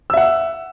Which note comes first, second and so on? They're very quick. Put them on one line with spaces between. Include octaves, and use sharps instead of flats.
E6 E5 F#5